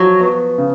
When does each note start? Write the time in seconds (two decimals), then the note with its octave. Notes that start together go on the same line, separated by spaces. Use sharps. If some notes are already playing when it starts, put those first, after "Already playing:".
Already playing: F3 F#3
0.20 B3
0.58 C#3